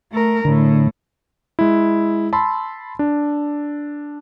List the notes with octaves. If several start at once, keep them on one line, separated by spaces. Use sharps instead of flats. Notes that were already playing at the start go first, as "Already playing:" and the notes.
A3 A#4
A2 D3
G#3 E4
A5 B5 C6 E6
D4